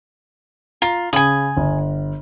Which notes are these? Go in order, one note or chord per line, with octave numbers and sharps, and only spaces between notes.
F4 A#5
C#3 G#5 B5 D#6 F#7
G1